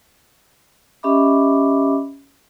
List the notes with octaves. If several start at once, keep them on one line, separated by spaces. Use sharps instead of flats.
C#4 G4 D#5 E5 B5 D6